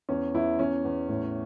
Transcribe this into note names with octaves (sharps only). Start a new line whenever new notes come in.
E2 C#4
E2 E4
E2 C#4
E2
A2